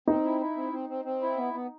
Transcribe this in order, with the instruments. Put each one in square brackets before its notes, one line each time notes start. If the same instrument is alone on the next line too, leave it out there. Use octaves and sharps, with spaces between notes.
[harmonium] C4 [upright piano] D#4
[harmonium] E4
E4
C4
C4
C4
C4
E4
B3
B3